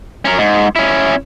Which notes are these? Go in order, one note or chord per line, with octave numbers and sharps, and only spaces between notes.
C#4 A#4
G#2
C#4 E4